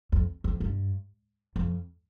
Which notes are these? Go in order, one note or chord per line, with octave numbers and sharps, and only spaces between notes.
F2
F2
G2
F2